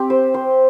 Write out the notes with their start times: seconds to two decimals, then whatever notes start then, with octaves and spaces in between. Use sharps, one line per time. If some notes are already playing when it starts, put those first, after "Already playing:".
Already playing: C4 G4
0.10 C5
0.34 C5